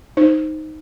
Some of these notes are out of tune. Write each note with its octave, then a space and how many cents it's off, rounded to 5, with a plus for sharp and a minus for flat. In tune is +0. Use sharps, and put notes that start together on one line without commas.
D#4 +0 C5 +0